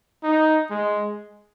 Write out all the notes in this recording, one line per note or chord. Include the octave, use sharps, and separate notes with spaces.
D#4
G#3